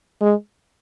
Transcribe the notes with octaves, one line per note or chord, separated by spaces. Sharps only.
G#3